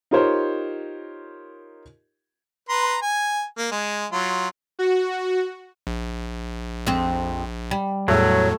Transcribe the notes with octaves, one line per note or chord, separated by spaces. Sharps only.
D#4 F4 G4 A#4 C5 C#5
B4 A#5 C6
G#5
A#3
G#3
F#3 F4
F#4
A#1
F2 C4
G3
E2 A2 F#3 A3